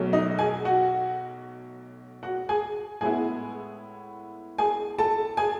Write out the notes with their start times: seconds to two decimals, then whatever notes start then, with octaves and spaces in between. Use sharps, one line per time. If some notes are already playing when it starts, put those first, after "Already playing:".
Already playing: B1 B2 F#3 A3
0.13 D#4 D#5
0.39 G#4 G#5
0.65 F#4 F#5
2.23 F#4 F#5
2.49 G#4 G#5
3.01 A2 G#3 B3 E4 G#4 G#5
4.58 G#4 G#5
4.98 A4 A5
5.37 G#4 G#5